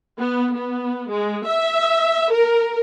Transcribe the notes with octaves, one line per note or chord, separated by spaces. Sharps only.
B3
B3
G#3
E5
A#4